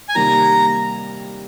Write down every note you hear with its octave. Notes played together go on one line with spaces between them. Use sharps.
G#5
C3 D#3 G3 A#3 A#5